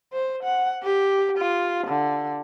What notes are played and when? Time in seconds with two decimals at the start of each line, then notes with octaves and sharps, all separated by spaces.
0.13 C5
0.44 F#5
0.84 G4
1.39 F4
1.88 D3